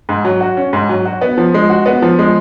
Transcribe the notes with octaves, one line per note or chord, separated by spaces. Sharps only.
G#2
F#3
F#4
C#4
G#2
F#3
F#4
B3
F3
G#3
F#4
B3
F3
G#3